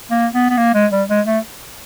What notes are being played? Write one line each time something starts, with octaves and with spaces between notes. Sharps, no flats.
A#3
B3
B3
A#3
G#3
G3
G#3
A3